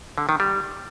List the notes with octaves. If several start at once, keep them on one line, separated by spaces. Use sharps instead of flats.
D3
D#3
G3